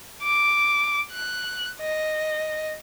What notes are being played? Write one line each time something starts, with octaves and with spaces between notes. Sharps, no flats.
D6
F#6
D#5